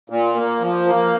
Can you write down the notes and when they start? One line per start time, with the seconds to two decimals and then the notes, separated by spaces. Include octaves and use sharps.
0.10 A#2
0.35 A#3
0.60 F3
0.86 A#3